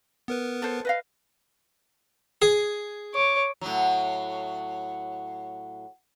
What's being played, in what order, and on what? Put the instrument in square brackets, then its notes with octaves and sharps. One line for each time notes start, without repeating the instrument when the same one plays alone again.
[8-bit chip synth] B3 A#4 B4
[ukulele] A4 C5
B4 D#5 F5
[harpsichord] G#4
[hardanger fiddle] C#5 D6
[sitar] A2 F#3